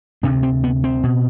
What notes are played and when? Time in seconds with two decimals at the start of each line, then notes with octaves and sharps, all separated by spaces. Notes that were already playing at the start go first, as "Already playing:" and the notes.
0.23 D2 C3 D4
0.43 C4
0.64 B3
0.84 C4
1.03 B2